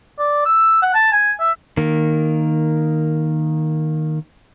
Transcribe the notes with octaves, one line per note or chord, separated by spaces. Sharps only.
D5
E6
F#5
A5
G#5
E5
D#3 A#3